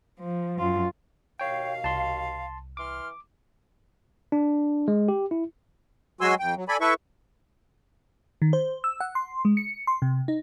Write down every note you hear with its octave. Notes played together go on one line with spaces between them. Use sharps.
F3
F#2 F4
D#2 B2 C#5 F5 G5
C2 A5 C6
E3 C6 D6 F6
D4
G#3
G4
E4
F#3 G#3 F#4 G#5 C6 E6
F2 G5
F#3
A4 D5 G#5 B5
E4 A4 B4 E5 C#6
D#3
C5
E6
F#5
C6
G#3
C#7
C6
C3
D#4